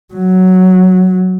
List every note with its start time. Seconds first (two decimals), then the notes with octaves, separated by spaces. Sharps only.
0.13 F#3